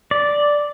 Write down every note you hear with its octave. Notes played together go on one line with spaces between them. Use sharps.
D5